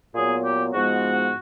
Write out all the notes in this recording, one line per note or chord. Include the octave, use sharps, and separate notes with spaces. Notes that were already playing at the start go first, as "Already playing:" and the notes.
A#2 F#3 B3 G#4
G4
G#2 F3 G#3 B3 F#4